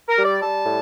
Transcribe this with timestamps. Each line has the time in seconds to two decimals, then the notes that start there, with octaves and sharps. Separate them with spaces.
0.08 A#4
0.17 G3
0.24 D5
0.41 G3 A5
0.65 A2